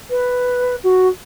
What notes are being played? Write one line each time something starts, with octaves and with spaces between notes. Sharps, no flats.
B4
F#4